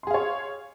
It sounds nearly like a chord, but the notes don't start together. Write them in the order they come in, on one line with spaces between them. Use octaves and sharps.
C6 G#4 F5 C#5